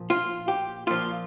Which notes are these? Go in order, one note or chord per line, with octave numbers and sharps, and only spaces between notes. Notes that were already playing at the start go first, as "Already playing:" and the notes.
Already playing: A#2 F3
F4
G4
A#2 F3 F4